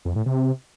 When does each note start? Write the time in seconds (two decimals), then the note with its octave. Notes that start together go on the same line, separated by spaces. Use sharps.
0.05 F2
0.16 A2
0.26 C3